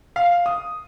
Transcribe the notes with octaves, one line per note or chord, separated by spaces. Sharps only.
F5
D#6